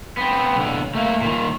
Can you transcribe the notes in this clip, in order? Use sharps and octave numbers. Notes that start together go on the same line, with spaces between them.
B3 C4
B1 D3
A3 A#3
A#2 D#3